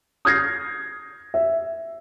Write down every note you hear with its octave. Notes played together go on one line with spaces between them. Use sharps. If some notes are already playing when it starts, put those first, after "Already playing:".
D#6 F6 G6 G#6 A#6 C7
E5